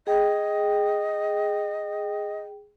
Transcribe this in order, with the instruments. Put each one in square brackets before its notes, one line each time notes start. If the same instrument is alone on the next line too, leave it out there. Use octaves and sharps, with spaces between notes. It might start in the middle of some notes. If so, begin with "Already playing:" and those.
[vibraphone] G#4 G5 [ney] D#5